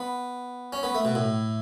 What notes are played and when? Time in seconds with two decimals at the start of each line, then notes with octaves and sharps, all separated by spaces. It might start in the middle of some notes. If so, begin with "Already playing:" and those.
Already playing: B3
0.73 C#4
0.83 B3
0.95 A3
1.05 B2
1.15 A2